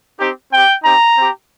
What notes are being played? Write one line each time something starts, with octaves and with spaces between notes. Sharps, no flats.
C4 D#4 G4
C4 G4 G5
C4 D#4 G4 A#5
C4 G4